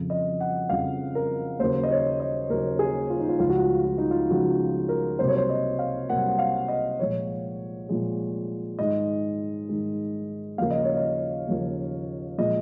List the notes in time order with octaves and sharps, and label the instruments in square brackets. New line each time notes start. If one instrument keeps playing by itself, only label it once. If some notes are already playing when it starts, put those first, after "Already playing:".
Already playing: [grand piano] F2 C#3 F3
D#5
F#5
F2 C#3 F3 F5
A#4
D#2 C#3 F#3 A#3 C5
D#5
C#5
D#5
D#2 C#3 F#3 A#3 A#4
G#4
F4
D#4
F4
C#2 C#3 F3 F4
F#4
F4
F4
D#4
F4
C#2 C#3 F3 F#4
A#4
C2 C3 F#3 A#3 C5
C#5
C5
D#5
F5
C2 C3 F#3 A#3 F#5
F#5
F5
D#5
A#2 F3 G#3 C#5
A#2 F3 G#3
G#2 D#3 G#3 D#5
G#2 D#3 G#3
D#2 C#3 F3 A#3 F5
D#5
C#5
D#5
D#2 C#3 F3 A#3
A#2 F3 G#3 D#5